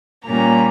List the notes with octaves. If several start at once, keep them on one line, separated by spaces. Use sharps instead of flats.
A#2 G3 A#3 C#4 A#5